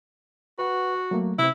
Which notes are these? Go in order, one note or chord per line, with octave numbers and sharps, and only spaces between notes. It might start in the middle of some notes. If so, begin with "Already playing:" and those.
F#4 B4 F#5
F#3 A3 A#3
C3 C4 E4